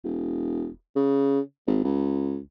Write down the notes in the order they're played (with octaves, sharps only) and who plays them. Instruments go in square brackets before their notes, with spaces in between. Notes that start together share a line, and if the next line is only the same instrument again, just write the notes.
[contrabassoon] E1
C#3
G#1
C#2